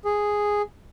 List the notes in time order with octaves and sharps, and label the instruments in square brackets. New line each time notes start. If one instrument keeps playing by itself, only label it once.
[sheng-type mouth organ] G#4